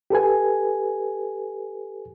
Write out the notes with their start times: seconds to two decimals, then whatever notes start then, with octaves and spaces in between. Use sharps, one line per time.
0.10 G4 A4 B4 G#5